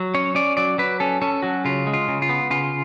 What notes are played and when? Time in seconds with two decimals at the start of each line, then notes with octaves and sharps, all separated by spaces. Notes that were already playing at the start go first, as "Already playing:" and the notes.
Already playing: F#3
0.14 C#4 C#5
0.35 C#4 D5
0.57 F#3 D5
0.78 F#3 B4
1.00 C#4 A4
1.22 C#4 A4
1.43 F#3 F#4
1.65 C#3 F4
1.87 G#3
1.93 F4
2.08 C#3
2.22 F4
2.29 B3
2.50 C#3 F4